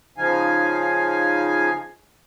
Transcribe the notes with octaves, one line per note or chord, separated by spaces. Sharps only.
C#3 F3 D#4 F5 G#5